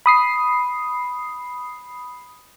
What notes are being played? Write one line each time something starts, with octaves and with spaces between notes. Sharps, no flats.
B5 D#6 C7